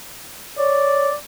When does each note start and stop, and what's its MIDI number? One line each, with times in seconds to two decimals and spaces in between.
0.58 1.09 73
0.58 1.15 74